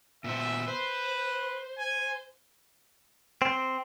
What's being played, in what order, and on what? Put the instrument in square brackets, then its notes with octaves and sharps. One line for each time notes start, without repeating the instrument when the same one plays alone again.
[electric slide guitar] A#2 B3 C5 [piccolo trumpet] E5
[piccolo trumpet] B4 [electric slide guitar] C5
[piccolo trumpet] G#5
[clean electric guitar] C4